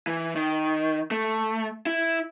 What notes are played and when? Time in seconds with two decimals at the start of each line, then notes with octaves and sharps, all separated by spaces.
0.07 E3
0.35 D#3
1.11 A3
1.86 E4